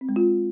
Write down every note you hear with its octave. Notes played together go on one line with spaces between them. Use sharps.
C4
G#3
F4